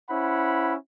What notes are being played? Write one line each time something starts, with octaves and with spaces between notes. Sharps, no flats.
C#4 E4 C5 F#5 B5